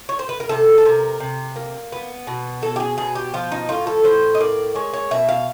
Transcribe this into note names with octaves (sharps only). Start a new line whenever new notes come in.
C#5
C5
B4
A#4
C3 A4
A4
C3 A#4
C3
A#3
B3
B2
F#3 A4
G4
G#4
B2 G#4
G4
F3 F4
D#4
A2 F4
A4
A2 C5
D#5
A#3 D5
G#3 C#5
C#5
B2 E5
F5